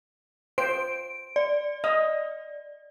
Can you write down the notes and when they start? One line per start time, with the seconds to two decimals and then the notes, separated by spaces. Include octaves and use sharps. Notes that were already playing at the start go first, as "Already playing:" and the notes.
0.58 C5 D7
1.36 D5
1.84 D#5